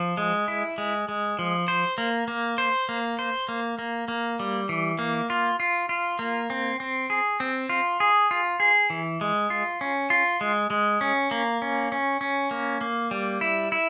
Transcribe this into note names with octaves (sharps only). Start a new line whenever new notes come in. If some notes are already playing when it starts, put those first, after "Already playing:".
Already playing: F3
G#3
E4
G#3
G#3
F3
C5
A#3
A#3
C5
A#3
C5
A#3
A#3
A#3
G3
E3
A#3
F4
F4
F4
A#3
C4
C4
G#4
C4
F4
G#4
F4
G#4
E3
G#3
F4
C#4
F4
G#3
G#3
C#4
A#3
C#4
C#4
C#4
A#3
A#3
G3
E4
E4